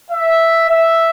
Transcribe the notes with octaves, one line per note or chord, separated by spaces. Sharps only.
E5
E5